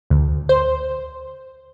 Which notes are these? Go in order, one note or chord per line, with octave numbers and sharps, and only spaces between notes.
D2
C5